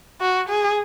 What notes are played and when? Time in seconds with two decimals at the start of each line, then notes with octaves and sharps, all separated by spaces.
0.21 F#4
0.49 G#4